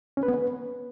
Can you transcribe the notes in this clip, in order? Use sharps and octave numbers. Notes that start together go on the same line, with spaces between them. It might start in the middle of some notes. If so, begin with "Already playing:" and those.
C#4
B4
B3
B4